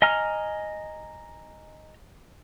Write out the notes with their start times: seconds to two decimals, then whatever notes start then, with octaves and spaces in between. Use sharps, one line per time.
0.02 D#5 G#5 A#5 F6